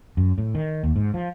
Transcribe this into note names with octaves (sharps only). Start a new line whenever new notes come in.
F#2
A2
D#3
D#2
G#2
F3